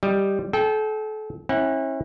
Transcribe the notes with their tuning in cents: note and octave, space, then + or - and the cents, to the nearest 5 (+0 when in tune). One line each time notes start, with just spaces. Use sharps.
G3 +0 D#5 +0
A4 -35 G5 +0
C#4 -45 E4 -20 F#5 +0